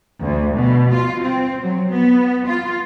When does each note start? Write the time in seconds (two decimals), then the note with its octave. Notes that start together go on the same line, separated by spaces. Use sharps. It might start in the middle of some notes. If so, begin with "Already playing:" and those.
0.22 D2
0.57 B2
0.94 F4
1.23 C4
1.63 F#3
1.91 B3
2.47 F4